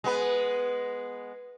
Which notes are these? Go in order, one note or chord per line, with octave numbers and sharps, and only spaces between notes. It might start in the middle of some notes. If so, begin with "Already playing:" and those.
G#3 B3 B4